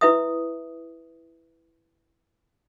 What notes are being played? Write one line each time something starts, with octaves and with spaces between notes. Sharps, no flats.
E4 B4 E5 D#6